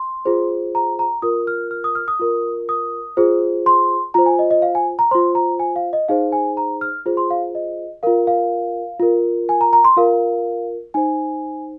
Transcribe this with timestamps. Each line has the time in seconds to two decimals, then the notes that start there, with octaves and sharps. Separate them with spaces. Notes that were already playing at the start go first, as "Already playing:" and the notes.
Already playing: C6
0.25 F4 G#4 C5
0.75 A#5
0.99 A#5
1.22 F4 A#4 D#6
1.47 F6
1.71 F6
1.84 D#6
1.95 F6
2.08 D#6
2.19 F4 A#4
2.69 D#6
3.17 F4 G#4 C5
3.66 C6
4.14 F4 C5 A#5
4.26 G#5
4.39 D#5
4.51 D#5
4.62 F5
4.75 G#5
4.99 A#5
5.11 F4 C5 C6
5.35 A#5
5.60 G#5
5.76 F5
5.93 D#5
6.08 D#4 G#4 C5 F5
6.32 G#5
6.57 A#5
6.81 F6
7.06 F4 G#4 C5
7.17 C6
7.31 F5
7.55 D#5
8.03 F4 A#4 F5
8.27 F5
9.00 F4 A#4
9.49 G#5
9.61 A#5
9.73 A#5
9.85 C6
9.97 F4 A#4 F5
10.94 D#4 C5 G#5